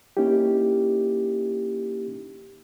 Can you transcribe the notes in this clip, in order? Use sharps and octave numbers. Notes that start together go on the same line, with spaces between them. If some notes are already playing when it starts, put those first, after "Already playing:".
A#3 C#4 D#4 E4 G4